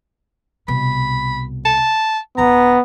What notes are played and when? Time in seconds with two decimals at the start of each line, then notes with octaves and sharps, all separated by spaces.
0.68 C2 B2 B5
1.65 A5
2.38 D#1 D3 B3 A#5